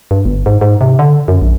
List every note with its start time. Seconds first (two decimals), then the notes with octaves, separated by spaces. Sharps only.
0.11 G2
0.25 G1
0.46 G#2
0.61 G#2
0.81 C3
0.99 D3
1.28 F#2
1.42 A#1